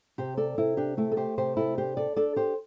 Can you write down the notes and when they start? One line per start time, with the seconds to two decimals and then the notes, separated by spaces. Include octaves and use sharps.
0.18 C3 G4 C5
0.37 A4 D5
0.58 C3 E4
0.77 D4 G4
0.97 A3 E4 A4
1.12 A4
1.17 G4 C5
1.38 C3 G4 C5
1.57 E4 A4
1.77 D4 G4 C5
1.97 A4 D5
2.16 D4 A4 D5
2.36 G4 C5